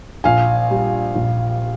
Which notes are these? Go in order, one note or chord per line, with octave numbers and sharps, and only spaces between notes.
A#1 F5 G#5
G3
A#1